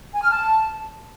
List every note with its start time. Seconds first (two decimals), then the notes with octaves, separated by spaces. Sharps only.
0.13 G#5
0.22 F6
0.30 A5